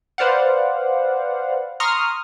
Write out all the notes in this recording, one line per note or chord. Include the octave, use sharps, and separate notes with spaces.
B4 C5 D5 F5 F#5
A#5 C6 C#6 D#6 F6